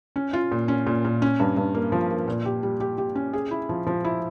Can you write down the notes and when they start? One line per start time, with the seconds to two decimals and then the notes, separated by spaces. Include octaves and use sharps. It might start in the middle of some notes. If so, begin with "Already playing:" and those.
0.16 C#4
0.33 F4
0.52 A#2
0.68 C#4
0.87 A#2
1.05 A#2
1.22 C#4
1.40 G2
1.57 G2
1.75 A#3
1.92 F3
2.10 A#3
2.28 A#2
2.45 G4
2.63 G3
2.80 G4
2.98 G4
3.15 C#4
3.33 G#4
3.51 E4
3.69 F3
3.87 F3
4.05 E4